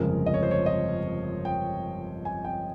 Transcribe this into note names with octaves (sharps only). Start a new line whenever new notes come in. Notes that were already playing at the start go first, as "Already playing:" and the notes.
Already playing: G1 F2 C#3 F3 G#3 A#4
D#5
C#5
C5
C#5
D#5
G5
G#5
G5